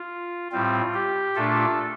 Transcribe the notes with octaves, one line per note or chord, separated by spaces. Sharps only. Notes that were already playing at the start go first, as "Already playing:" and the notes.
Already playing: F4
A2 G3 C4 F4
G4
A#2 A3 D4 F4 A4